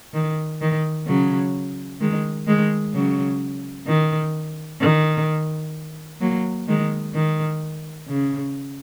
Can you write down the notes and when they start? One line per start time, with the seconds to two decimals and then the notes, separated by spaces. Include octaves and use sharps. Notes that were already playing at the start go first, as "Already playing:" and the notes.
0.14 D#3
0.61 D#3
1.07 C#3 F#3
2.01 D#3 G#3
2.47 D#3 G#3
2.94 C#3 F#3
3.87 D#3
4.81 D#3
6.21 F#3 A#3
6.68 D#3 G#3
7.14 D#3
8.08 C#3